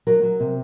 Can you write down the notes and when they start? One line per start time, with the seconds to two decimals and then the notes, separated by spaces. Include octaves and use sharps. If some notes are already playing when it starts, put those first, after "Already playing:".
0.07 F#3 A#4
0.23 F#3
0.40 C3